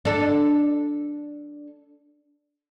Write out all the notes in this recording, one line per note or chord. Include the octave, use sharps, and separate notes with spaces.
D4 A4